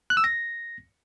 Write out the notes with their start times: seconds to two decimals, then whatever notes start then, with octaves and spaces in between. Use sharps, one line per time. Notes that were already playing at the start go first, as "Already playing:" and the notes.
0.10 F#6
0.17 E6
0.24 A#6